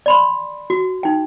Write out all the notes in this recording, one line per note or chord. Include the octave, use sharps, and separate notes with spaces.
D5 B5 C6
F#4
D#4 G5